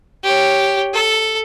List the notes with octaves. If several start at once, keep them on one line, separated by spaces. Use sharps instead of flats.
G4 C#5
A4